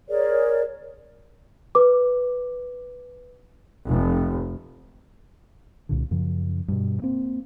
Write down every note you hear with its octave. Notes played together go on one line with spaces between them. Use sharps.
G#4 A#4 C#5 D5
B4 D6
F1
C2 A#2 D3
F#2 C#3 F3
G2 B2
A#3 C4